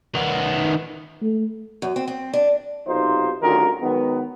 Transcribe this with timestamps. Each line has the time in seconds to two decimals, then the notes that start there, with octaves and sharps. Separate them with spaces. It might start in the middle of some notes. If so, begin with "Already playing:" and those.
0.15 D#3 B3
1.22 A3
1.82 F#2
1.96 C4
2.08 C4
2.33 D4
2.87 B1 C3 D#4 F4 C5
3.42 D2 G2 D#3 C#4 F4 A#4
3.81 D#3 F#3 G#3 B3